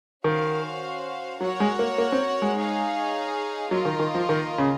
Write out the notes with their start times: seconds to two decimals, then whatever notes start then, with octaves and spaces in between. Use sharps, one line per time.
0.24 D#3 C#4 F#4 C5 F5
1.41 F#3 F#4 A#4 C#5 F#5
1.60 G#3
1.79 A#3
1.98 A#3
2.12 C4
2.42 G#3
2.56 D#4 G#4 C#5 F5
3.71 F#3 A#3 F4 A#4 D#5
3.85 D#3
4.00 D#3
4.15 F3
4.29 D#3
4.58 C#3